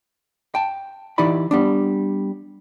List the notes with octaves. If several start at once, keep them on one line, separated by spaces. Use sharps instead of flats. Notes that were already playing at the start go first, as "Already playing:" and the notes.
G5 A5
E3 D#4 E4 G4 D5 B5
G3 B3 D4